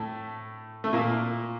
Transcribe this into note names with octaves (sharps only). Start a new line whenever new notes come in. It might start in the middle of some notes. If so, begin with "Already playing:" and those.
Already playing: A2 A3
A3
A#2 A#3